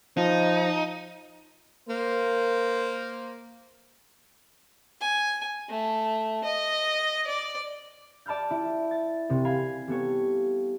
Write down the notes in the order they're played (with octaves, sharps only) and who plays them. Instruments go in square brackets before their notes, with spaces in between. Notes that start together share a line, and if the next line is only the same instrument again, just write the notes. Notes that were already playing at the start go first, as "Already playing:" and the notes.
[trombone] F3 [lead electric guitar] D#4
[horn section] A#3 C5
[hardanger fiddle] G#5
A3
D#5
D5
[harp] D5 A5 B5 F6 G6
E4
A6
C2 C3
F5 G#5 B5
G3 B3 A4 C#5